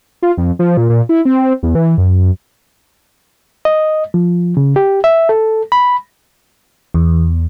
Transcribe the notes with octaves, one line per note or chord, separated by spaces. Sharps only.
F4
F2
F3
A#2
A#2
E4
C4
E2
E3
F#2
D#5
F3
C#3
G4
E5
A4
B5
E2